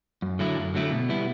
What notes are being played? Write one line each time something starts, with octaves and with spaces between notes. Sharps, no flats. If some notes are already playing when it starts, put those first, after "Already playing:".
F#2
D3 F#3 A3 E4
F#2
D3 F#3 A3 E4
B2
G3 B3 E4